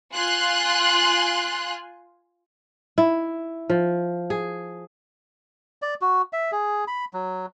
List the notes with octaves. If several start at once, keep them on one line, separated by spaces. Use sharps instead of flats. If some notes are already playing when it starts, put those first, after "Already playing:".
F4 G#5 C6 F#6
E4
F3
G#4
D5
F#4
E5
G#4
B5
F#3